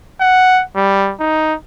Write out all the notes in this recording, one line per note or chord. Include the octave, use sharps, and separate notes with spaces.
F#5
G3
D#4